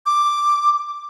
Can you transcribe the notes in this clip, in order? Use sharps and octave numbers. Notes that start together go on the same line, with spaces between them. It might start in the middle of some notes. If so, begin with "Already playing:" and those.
D6